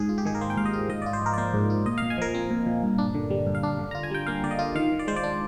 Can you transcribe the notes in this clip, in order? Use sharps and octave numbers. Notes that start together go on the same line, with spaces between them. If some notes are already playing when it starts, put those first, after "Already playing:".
Already playing: G#2 G#4
F4
G4
D#3 G#4
A#4
A#3 C5
G5
G#2 F5
D#5
F4
G#2 D#5
F4 D5
C5
F3 A#4
D5
A#3 C5
G#2
F4
A#2 D#5
A#2 F5
G#5
F3 A#4
C4
A#2
A#2
G2
D4
D3
G3
G2
F5
D4
D3
F4 A#5
G#5
G3 G5
A#3 F5
D3 D5
D#5
F4
D#3 F5
D#3
D5
G#3 C5
D5
D4